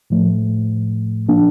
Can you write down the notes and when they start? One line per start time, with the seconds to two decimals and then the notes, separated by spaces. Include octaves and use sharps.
0.10 A2 F3 A3
1.29 A#2 F3 A#3 D4